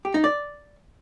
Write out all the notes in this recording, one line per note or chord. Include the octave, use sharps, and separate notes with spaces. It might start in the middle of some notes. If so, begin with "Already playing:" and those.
G4
D#4
D5